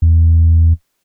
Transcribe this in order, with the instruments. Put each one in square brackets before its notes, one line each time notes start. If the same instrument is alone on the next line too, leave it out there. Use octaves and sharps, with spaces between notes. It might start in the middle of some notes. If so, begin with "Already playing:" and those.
[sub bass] E2